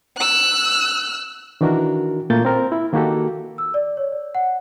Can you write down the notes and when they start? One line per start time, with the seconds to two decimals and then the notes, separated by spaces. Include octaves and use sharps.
0.18 E6 F#6
1.61 D#3 E3 D4 F#4 A#4
2.30 A#2 A3 A#3 G6 A6
2.45 C4 A#4
2.72 E4
2.93 D#3 A#3 F#4 G4 A4
3.58 E6
3.74 D5
3.97 C#5
4.12 D5
4.35 F#5